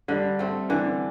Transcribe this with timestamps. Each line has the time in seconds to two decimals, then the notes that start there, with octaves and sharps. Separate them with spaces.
0.08 D3 G3
0.39 A3 C4
0.69 D3 E3